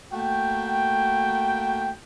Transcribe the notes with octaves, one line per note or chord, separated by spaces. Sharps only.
A3 A#3 F#4 G5